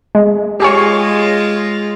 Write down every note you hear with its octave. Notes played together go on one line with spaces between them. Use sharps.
G#3
G#3 F4 G4 G#4 C#5